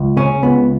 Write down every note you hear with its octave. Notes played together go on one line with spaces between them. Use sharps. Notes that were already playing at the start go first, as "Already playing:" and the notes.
Already playing: C#2
C#3 C#4
C#2 B3